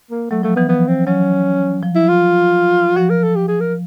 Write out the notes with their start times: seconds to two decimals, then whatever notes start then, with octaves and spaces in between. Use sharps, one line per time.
0.11 A#3
0.31 F#3 A3
0.43 F3 A3
0.56 E3 B3
0.69 F3 B3
0.87 C4
1.06 F#3 C#4
1.83 F3
1.95 E4
2.08 F4
2.97 F3 F#4
3.10 A#4
3.23 A4
3.35 G4
3.48 G#4
3.61 A#4